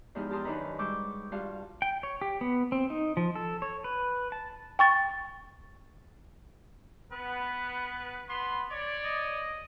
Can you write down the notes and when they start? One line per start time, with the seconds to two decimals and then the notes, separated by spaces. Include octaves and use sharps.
0.15 E2 G#2 F3 D#4 G4 F6
0.31 G4 A5 A#5 C6 D#6 E6
0.44 F#2 D#3 D4 D#4 B4 A#5
0.79 G#2 G3 C#6 D6 E6 G6
1.32 G2 F4 F#4 F5 A5
1.82 G5
2.03 C#5
2.21 G4
2.41 B3
2.72 C4
2.90 D#4
3.17 F3
3.35 A4
3.62 C#5
3.84 B4
4.32 A5
4.79 G5 C#6 A6
7.12 B3 B4
8.29 B3 B5 C6
8.71 C#5 D5
9.04 D#5